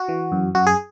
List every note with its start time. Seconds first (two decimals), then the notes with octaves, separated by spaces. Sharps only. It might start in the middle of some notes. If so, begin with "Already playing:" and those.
Already playing: F#4
0.08 E3
0.32 F#2
0.55 F#2 F#4
0.67 G#4